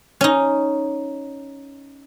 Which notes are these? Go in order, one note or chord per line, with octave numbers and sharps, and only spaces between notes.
C#4 D#4